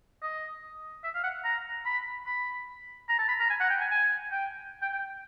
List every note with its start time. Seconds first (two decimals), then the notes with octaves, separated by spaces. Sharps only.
0.22 D#5
1.04 E5
1.14 F5
1.24 F#5
1.44 A#5
1.85 B5
2.26 B5
3.09 A#5
3.19 A5
3.28 B5
3.40 A#5
3.50 G#5
3.60 F#5
3.70 G5
3.80 G#5
3.91 G#5
4.31 G5
4.82 G5
4.92 G5